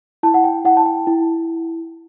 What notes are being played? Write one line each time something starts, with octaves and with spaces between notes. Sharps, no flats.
E4 A5
F#5
G5
E4 F#5
A5
G5
E4